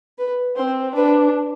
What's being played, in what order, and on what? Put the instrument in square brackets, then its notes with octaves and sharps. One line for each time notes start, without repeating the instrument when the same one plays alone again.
[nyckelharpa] B4
[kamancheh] C4 [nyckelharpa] C5
[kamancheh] D4 [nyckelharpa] B4